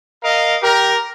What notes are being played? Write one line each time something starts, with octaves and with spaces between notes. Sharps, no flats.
A#4 D#5 F5
G4 A#4